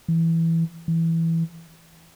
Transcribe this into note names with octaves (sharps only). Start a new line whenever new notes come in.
E3
E3